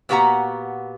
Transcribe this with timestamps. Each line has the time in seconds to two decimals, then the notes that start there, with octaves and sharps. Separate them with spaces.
0.09 A#2 B3 F#4 G4 F#5 A#5